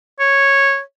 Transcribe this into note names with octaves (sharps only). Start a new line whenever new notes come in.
C#5